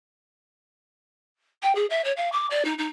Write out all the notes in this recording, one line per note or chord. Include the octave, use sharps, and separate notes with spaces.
G5
G#4
E5
C#5
F5
D6
D5
D#4
D#4